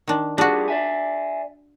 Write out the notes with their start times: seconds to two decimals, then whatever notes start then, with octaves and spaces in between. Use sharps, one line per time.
0.08 D#3 D4
0.38 G3 D4 F4 F#4 G#4
0.68 D5 E5 G#5